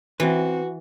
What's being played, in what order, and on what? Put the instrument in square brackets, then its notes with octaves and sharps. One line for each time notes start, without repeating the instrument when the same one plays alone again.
[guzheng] E3 [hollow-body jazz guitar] C4 B4 [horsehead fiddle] F#4